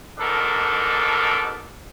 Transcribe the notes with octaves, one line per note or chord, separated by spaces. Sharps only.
G#2 B2 D4 A4 A#4